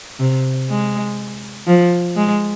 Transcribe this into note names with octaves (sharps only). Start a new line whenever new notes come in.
C3
G#3
F3
G#3